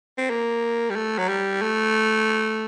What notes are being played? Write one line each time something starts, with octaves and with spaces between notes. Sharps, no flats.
C4
A#3
G3
A3
F#3
G3
A3